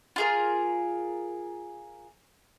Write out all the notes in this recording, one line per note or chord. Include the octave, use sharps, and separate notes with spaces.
F4 G#4 A#4